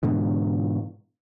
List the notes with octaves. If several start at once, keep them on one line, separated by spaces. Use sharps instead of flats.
G#2 B2 D3 E3